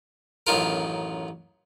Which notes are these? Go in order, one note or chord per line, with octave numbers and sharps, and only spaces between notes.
A1 F#2 D#3 F4 A#4